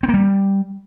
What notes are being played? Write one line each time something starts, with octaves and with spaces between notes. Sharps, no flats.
C4
A#3
G3